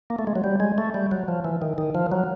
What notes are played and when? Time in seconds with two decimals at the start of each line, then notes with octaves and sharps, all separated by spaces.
0.10 A#3
0.19 A3
0.27 G#3
0.35 F#3
0.44 G3
0.60 G#3
0.78 A3
0.94 G3
1.11 F#3
1.28 F3
1.44 E3
1.62 D#3
1.78 D#3
1.95 F3
2.12 F#3